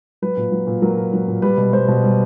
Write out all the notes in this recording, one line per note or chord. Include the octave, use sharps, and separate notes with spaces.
F#3 B4
A#2
F#3
A#2
F#3 A#4
A#2
F#3
A#2
G3 B4
B2
G3 C5
B2
G3